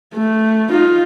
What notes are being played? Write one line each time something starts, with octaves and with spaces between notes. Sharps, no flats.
A3
D#4 F4